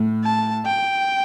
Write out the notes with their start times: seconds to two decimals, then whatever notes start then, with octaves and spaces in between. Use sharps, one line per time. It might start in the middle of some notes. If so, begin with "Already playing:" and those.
Already playing: A2
0.24 A5
0.66 G5